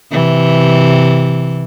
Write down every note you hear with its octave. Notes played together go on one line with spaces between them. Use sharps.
C3 E3